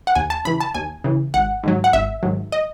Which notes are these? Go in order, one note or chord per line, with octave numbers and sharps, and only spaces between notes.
F#5
D#2 G#5
A5
C#3 E3 B5
A5
D#2 G#5
C#3 E3
G#1 F#5
G#2 D#3 F#3
F#5
G#1 E5
G#2 D#3 F#3
D#5